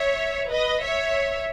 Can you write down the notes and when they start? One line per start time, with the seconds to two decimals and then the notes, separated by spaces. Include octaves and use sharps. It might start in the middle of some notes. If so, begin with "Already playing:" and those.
Already playing: C#5 E5
0.49 B4 D#5
0.81 C#5 E5